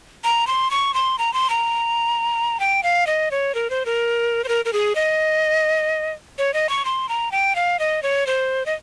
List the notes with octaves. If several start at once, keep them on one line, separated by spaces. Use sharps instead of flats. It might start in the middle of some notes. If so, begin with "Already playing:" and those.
A#5
C6
C#6
C6
A#5
C6
A#5
G5
F5
D#5
C#5
A#4
C5
A#4
C5
A#4
A#4
G#4
D#5
C#5
D#5
C#6
C6
A#5
G5
F5
D#5
C#5
C5
D#5